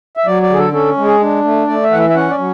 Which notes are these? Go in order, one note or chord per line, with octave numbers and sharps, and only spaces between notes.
E5
F#3 D5
D5
D3 G#4
A4
C#4 A4
G#3
G#4
D4
A3
A3 D5
E5
E3 F#5
E5
E5
C#4 F#5
D5
F#3